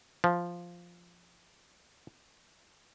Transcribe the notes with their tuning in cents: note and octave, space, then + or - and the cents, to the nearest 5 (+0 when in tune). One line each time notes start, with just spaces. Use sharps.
F3 +0